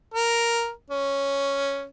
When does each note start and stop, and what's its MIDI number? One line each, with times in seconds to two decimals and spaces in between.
0.14 0.70 70
0.91 1.85 61